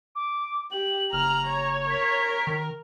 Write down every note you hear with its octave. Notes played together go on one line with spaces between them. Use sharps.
D6
G4 F#7
F#1 A#5 F6
C#5
A#4 B6
D#3